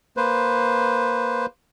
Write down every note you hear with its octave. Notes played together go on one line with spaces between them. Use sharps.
A#3 B4 C5